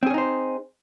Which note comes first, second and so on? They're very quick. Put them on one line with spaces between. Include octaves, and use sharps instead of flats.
C4 G#4 C#4 D#4 C5